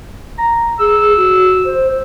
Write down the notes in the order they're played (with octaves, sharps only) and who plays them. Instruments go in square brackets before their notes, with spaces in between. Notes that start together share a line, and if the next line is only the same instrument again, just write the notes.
[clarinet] A#5
[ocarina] G#4 [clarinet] E6
[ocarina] F#4
C5